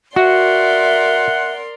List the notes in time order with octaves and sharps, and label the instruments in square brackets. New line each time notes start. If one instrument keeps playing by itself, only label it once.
[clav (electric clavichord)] F#4 [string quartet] A#4 D5 C6 [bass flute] E5 [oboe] F#5